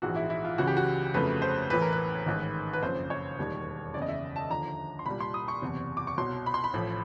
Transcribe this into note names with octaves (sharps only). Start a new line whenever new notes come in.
A#1 G#2 E3 G#3 F#4
E4
E4
F4
C#2 C#3 E3 F#4
G4
F#4
G1 F2 C#3 F#3 A3 B4
C5
A1 A2 E3 B4
A#4
B4
A1 G#2 D#3
B4
F#1 F2 C#3 C5
C#5
E1 D#2 D#3 G3
F#1 E2 C#3 D5
D#5
E5
A5
D#2 D3 F3 A#5
C6
C2 A#2 G3 B5
C6
D#6
C#6
F#1 E2 C3
D6
C#6
C2 B2 F#3 C6
B5
C6
B5
A1 A2 F3